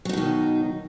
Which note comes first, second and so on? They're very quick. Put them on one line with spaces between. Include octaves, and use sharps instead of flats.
F#3 D#4 B2 D#3